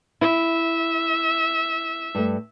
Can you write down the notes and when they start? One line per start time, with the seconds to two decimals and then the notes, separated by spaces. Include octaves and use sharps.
0.21 E4 E5
2.15 G2 A3